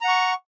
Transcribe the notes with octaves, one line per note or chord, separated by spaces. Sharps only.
F#5 A#5 C#6